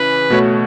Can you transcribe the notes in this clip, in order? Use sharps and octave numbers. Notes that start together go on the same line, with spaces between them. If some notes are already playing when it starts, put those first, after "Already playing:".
Already playing: C#3 E3 B4
B2 A3 F#4 C#5